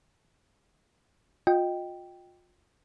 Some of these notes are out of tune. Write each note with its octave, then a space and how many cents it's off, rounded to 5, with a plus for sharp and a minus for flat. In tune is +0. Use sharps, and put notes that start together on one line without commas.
F4 +35 D#5 +0 G5 +0